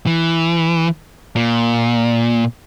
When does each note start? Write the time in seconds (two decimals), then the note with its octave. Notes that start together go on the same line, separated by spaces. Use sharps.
0.07 E3
1.36 A#2